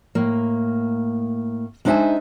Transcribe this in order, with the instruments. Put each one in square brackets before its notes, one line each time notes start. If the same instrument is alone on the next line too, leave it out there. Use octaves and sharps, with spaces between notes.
[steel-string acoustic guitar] A2 A#3
G#3 D4 D#4 C5 E5 G#5